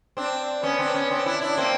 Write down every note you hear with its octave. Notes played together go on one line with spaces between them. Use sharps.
C4 D4
B3 C#4
C4 D4
B3 C#4
C4 D4
D4 E4
D4 E4
A#3 C4